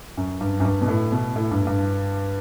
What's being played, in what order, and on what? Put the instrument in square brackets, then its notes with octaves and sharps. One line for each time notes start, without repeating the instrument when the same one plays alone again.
[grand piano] F#2
G2
F#2
G2
B2
A2
B2
A2
G2
G2